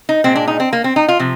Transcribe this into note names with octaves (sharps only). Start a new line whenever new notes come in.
D#4
A#2 G#3 C4
D4
D#4
C4
A#3
C4
D#4
F4
C3 F3